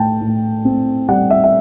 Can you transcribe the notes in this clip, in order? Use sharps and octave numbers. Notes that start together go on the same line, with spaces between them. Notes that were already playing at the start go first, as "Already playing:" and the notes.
Already playing: A2 G5 A5
A2
C4
G3 F#5
E5
E5